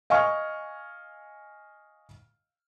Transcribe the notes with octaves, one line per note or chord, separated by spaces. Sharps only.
D#5 F5 G#5 C#6 F6